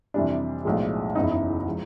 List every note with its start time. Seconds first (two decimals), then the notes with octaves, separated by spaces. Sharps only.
0.14 F2 C3 E3 G3 D4
0.65 B1 A2 F3 G#3
1.15 F#1 E2 C#3 D#4
1.23 E4
1.31 D#4
1.68 F3 G#3